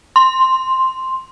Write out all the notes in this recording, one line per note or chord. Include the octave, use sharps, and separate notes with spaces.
C6